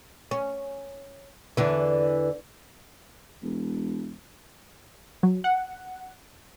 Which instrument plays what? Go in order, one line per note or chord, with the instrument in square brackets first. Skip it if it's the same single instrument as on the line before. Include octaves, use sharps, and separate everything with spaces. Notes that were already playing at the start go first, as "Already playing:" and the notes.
[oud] C#4
E2 D3 E3
[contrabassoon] E1
[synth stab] F#3
F#5